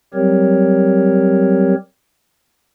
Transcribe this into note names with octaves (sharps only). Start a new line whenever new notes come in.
F#3 G3 C4 G4 A#4 C#5